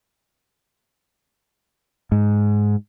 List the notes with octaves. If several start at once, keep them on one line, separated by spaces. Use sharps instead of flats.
G#2